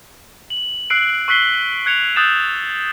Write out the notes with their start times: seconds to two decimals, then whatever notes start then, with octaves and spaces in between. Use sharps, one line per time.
0.50 F#7
0.90 E6 F#6 C7 D7
1.28 C#6 E6 F#6 B6 C7 G7
1.86 F#6 G#6 C#7 F7
2.16 D#6 E6 F#6 G6 A6 E7